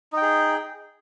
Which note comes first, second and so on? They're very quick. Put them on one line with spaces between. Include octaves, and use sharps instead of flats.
D#4 G5 G#4